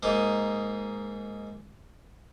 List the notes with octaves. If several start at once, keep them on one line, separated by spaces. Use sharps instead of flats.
G#2 A#3 D#4 D#6